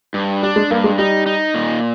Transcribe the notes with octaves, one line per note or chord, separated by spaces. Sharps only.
G2
G3 D4
G#3
G2 A#3
G#3
G3 D#4
D#4
A#2